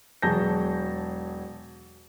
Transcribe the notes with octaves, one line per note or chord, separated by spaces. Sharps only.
E1 F#3 G#4 A5 G6 A#6